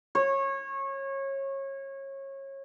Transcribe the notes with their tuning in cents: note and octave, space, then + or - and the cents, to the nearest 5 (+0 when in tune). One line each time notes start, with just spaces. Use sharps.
C#5 -25